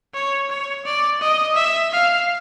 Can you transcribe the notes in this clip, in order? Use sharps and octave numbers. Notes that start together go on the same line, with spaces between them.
C#5
C#5
D5
D#5
E5
F5